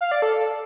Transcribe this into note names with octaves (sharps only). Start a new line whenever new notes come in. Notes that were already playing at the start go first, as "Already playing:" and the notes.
F5
D5
A4